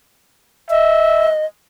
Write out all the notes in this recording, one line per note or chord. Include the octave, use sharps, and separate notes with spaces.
D#5 E5